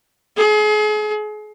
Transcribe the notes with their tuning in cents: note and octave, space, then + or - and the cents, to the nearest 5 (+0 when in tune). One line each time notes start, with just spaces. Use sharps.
G#4 +35